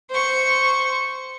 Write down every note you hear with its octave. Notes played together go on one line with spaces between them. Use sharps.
C5 C#6